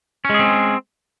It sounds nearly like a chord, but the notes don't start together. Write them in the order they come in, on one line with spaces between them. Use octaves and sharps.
C#4 G#3 G#4 C4